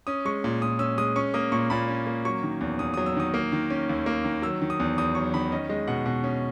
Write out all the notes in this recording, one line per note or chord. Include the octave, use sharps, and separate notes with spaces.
C#4 D#6
G#3 C#6
A#2
A#2 D#6
C#4 E6
G#3 D#6
C#4 C#6
A#3 D#6
A#2 C#6
A#2 B5
C#4
A#3
F#3 C#6
D#3
E2
E2 D#6
F#3 D#6
E6
D#3 D#6
A#3
D#3
C#4
D#2
A#3
D#3
F#3 E6
D#3
D#6
E2
E2 D#6
F#3 C#6
D#3 B5
C#4 D#5
G#3 D#5
B2 F#5
B2 F#5
C#4